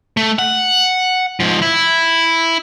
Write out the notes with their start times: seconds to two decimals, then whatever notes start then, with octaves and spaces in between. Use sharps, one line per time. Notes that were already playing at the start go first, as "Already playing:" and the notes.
0.17 A3
0.39 F#5
1.40 G#2 F3
1.62 E4